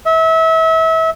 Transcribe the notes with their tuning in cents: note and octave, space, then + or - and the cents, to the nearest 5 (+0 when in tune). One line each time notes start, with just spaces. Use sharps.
E5 -30